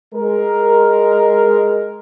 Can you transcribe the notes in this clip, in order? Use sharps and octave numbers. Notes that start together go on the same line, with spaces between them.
G#3 A#4